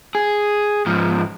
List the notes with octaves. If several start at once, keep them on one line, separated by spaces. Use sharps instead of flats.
G#4
G#2 F3